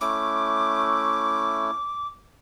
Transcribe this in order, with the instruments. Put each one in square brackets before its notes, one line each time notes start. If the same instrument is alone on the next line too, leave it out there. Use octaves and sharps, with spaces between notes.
[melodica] A3 C#4 E4 [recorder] D6